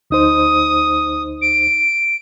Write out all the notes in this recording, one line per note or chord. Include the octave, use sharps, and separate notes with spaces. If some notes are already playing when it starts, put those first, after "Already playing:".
D2 D#4 C5 D#6
D7